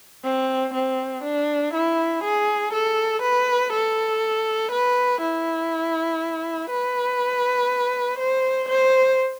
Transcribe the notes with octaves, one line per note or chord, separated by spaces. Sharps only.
C4
C4
D4
E4
G#4
A4
B4
A4
B4
E4
B4
C5
C5